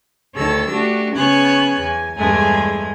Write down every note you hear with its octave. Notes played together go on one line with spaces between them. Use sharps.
D2 D#3 A4 C#5 E6
A3 D4 F#4 G4
C#3 B3 C#5 G#5 F#6 G#6
E2 G#5
E2 G2 G#3 A3 G#5